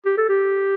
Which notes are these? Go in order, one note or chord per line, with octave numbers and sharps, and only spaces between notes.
G4
A4
G4